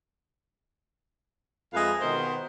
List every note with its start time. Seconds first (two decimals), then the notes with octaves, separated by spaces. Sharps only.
1.73 F2 G#3 C4 B4 E5 F5
2.01 B2 D#3 B3 D#4 A#4 C5